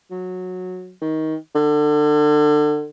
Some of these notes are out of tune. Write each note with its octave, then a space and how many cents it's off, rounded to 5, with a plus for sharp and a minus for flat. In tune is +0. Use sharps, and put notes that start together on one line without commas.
F#3 -15
D#3 +20
D3 +30